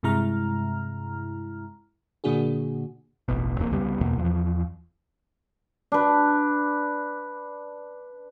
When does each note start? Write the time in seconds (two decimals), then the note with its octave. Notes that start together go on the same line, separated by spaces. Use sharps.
0.03 G2 C3 G#3 E4 A#5 F6
2.24 A#2 D3 A#3 D4 F#4 G#4
3.28 E1 A1 B2
3.58 D#1 F2 G#3 A#3
3.71 C2 C#3 G3 B3
4.01 E2 B2 A#3
4.17 E2 F3
5.92 D4 B4